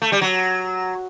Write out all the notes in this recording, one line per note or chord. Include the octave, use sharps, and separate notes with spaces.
A3
G3
F#3